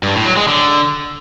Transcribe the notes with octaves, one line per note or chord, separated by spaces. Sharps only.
G2
A2
F#3
G#3
D3